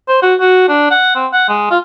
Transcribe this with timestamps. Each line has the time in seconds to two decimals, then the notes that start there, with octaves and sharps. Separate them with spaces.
0.08 C5
0.22 F#4
0.40 F#4
0.68 D4
0.91 F#5
1.15 C4
1.33 F#5
1.49 G#3
1.71 F4